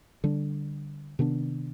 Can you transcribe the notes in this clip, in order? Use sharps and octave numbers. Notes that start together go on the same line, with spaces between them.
D3 G3 D4
C3 D#3 B3 D4